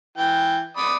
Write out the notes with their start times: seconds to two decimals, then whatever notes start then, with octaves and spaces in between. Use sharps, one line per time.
0.17 E3 G5
0.77 D5 B5 D#6